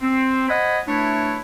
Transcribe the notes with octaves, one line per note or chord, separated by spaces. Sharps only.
C4
C5 D#5 F#5 G#5 B5
A3 D4 E4 B4 C#5